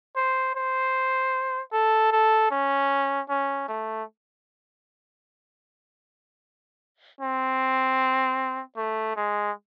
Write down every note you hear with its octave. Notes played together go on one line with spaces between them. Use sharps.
C5
C5
A4
A4
C#4
C#4
A3
C4
A3
G#3